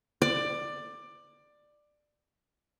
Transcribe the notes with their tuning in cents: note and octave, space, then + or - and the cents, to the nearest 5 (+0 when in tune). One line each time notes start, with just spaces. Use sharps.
D5 +15